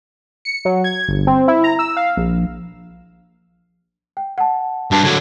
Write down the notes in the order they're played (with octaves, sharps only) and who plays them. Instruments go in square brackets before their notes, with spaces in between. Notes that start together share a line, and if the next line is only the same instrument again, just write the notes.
[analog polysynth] C#7
F#3
G#6
G1
C4
E4
A#5
E6
F5
A#1
[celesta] G5
F#5 A5
[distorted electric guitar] G2 [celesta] F#4 A5 C7
[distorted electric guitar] D3 F#3 [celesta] G#6